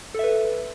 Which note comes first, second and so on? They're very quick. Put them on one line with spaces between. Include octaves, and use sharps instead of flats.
A4 E5 B4